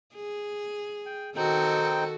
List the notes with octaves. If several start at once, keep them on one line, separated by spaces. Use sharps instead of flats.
G#4
G5
D#3 C4 D#4 F#4 A4 G5